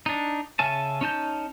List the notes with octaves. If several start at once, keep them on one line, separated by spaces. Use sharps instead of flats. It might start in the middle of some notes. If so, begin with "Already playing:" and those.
D4 D#4
C#3 C#4 E5 G#5 A5
C#4 D#4 A5 G6